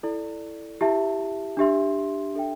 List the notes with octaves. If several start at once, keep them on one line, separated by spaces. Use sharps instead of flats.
E4 A4 D5
E4 G4 E5 A5
D4 G4 E5 C6
D4 A4 E5 G5